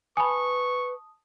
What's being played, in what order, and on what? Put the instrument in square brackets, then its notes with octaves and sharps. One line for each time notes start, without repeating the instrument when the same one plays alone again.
[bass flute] B4 [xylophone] G#5 B5 [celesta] A5 D#6 [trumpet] C#6